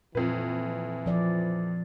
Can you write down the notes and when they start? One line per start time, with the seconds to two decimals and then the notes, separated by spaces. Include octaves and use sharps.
0.15 F2 A#2 E3 B4
1.06 F3 D5